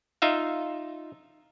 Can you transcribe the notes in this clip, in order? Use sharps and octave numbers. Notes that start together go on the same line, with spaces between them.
D#4 F4 E5 F5